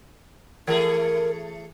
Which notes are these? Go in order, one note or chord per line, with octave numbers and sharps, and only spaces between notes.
E3 A3 G#4 A#4